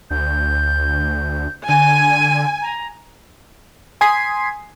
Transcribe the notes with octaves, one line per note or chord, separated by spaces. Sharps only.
D2 G6
D3 G#5 D#7
A#5
G#5 C6 D#6 G#6 B6 C7